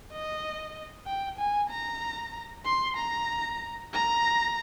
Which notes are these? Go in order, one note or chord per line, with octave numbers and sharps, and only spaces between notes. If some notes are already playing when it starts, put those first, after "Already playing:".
D#5
G5
G#5
A#5
C6
A#5
A#5